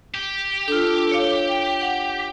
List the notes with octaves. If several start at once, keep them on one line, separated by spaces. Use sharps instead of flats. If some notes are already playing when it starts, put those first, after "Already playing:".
G4
D4 F4 A4
C#5 F5
G5
F#5